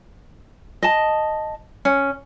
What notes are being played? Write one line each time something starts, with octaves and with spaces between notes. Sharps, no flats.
D#5 A5
C#4